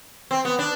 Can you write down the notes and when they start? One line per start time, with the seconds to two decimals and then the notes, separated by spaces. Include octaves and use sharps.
0.31 C4
0.45 B3
0.59 D4